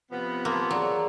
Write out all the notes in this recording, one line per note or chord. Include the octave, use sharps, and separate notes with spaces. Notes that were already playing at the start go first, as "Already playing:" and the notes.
C3 F3 B3
A#3 A5 C6 E6
F#3 G#4 D5 A#5